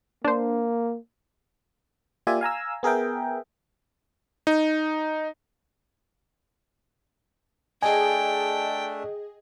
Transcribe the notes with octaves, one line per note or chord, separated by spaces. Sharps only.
A#3 D4 C5
A#3 F4 G4 D5 E5 G#5
F5 G#5 A#5 E6
B3 G#4 A#4 E5 G5
D#4
A3 D4 G#4 D#5 G5 G#5